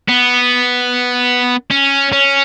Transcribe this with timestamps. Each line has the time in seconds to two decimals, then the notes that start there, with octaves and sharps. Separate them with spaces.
0.09 B3
1.71 C#4
2.13 C#4